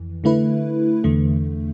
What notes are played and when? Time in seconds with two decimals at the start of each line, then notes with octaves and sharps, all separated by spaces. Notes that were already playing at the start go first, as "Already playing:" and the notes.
Already playing: F2 E3
0.24 D3 A3 E4 B4
1.04 E2 D3 A3